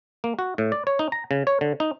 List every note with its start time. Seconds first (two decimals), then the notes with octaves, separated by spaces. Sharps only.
0.24 A#3
0.39 F#4
0.58 A2
0.72 D5
0.87 C#5
0.99 D#4
1.12 A#5
1.31 C#3
1.47 C#5
1.61 D3
1.80 D#4